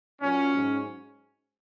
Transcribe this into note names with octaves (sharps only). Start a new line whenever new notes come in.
A#2 F#3 C#4
G#2 F#3